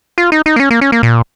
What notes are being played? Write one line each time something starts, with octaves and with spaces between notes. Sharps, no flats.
F4
D#4
D#4
A#3
C#4
A#3
C#4
A#3
A#2